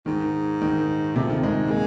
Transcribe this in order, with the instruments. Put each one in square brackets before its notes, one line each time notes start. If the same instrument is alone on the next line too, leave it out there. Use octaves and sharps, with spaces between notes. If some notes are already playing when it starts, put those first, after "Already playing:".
[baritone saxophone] G#2 [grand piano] D#3
[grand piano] D#3
[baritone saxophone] F2 [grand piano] C3
[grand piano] D#3
[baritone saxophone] G#2 [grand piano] G#3
[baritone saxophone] G#3 [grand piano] A#3